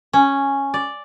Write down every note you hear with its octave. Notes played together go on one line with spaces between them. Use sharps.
C#4
D5